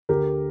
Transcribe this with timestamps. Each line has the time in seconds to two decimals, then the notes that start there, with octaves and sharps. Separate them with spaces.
0.09 D2 G4 A#4